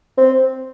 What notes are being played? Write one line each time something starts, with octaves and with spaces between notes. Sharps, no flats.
C4